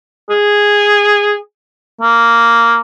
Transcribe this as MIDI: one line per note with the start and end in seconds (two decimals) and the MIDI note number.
0.30 1.36 68
2.01 2.80 58